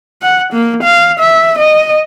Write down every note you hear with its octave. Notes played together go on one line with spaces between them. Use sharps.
F#5
A#3
F5
E5
D#5